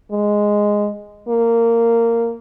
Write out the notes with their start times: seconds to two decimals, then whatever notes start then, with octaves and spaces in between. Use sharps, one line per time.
0.11 G#3
1.29 A#3